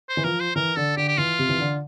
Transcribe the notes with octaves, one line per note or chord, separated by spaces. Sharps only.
C5
E3
F3 A#4
C5
E3 A#4
D3 A4
D3 G4
G4
E3 F4
C3
E3
D3